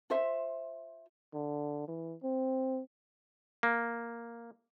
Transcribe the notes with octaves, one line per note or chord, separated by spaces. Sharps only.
F4 C5 E5
D3
E3
C4
A#3